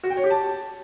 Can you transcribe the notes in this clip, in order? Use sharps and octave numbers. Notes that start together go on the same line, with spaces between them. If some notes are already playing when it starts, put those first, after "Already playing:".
F#4
G5
C#5
G4
A5